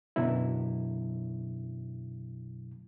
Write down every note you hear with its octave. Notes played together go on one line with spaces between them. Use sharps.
F#2 B2 D3 F#3 E4